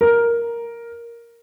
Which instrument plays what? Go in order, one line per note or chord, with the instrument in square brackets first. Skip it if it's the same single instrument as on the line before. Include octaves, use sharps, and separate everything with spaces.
[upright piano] A#4